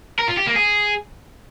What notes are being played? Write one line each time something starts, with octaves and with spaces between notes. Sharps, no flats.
A#4
F4
G4
A#3
G#4